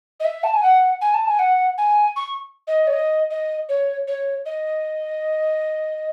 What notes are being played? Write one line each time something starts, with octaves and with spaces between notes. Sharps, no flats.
D#5
E5
A5
G#5
F#5
G#5
A5
G#5
F#5
G#5
C#6
D#5
C#5
D#5
D#5
C#5
C#5
D#5